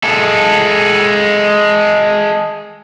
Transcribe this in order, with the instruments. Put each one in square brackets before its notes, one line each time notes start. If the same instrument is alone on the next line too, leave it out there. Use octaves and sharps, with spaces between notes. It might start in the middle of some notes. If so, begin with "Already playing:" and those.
[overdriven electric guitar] G#3 A4